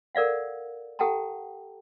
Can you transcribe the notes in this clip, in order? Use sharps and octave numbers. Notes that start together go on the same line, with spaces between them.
A4 A#4 D5 F5 F#5
G4 A4 F#5 G5 A5 A#5